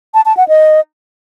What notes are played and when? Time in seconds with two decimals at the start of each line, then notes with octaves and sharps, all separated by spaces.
0.14 A5
0.26 A5
0.37 F#5
0.48 D#5